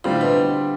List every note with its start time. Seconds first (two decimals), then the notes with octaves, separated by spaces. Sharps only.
0.04 A2 D3 G3 C4 F4
0.21 B2